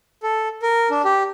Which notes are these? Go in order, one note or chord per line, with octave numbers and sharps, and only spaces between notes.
A4
A#4
D4
G4